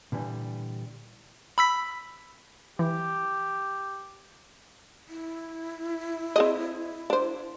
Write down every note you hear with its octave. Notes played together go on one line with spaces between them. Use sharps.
A#2 D3 E3 G3
B5 E6 B6
E3 G4
E4
C4 G#4 D#5
D4 C5